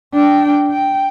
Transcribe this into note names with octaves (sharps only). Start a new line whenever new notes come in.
D4 G5
G5